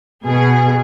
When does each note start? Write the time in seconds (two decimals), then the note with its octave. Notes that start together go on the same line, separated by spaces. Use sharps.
0.24 B2 G#4